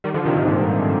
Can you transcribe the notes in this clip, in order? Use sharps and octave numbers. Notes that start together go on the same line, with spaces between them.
D#3 G3
D3 F3
C3 D#3
G#2 C3
G2 A#2